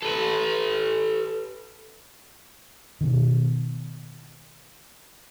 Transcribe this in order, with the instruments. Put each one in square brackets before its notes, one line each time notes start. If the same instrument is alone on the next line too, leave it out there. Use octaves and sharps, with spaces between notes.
[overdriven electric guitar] A4 B4
[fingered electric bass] B2 D#3